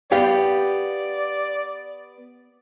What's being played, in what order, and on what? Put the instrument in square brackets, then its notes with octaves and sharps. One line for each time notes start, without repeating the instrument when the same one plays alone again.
[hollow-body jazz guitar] B3 G4 F5 [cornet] D5